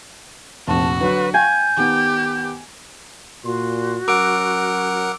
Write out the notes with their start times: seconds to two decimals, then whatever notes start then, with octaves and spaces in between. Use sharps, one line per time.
0.67 F1 A#1 F#4 A5
1.01 D3 F#3 B4
1.34 F5 G5 G#5 G6
1.77 D#3 B3 G4
3.45 A#2 F#4 C6
4.08 F#3 C#4 A#4 F#5 D6 E6 D7